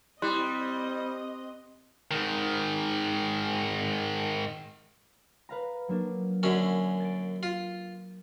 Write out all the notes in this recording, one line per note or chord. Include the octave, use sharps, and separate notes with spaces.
G3 C4 E4 D#5 C6 F#6
G#2 D#3
B4 F5 A#5
F#3 A#3 D4
F#2 D3 C#4
A6 D7
F4